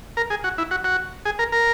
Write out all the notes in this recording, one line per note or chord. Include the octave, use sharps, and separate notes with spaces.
A#4
G#4
F#4
E4
F#4
F#4
G#4
A#4
A#4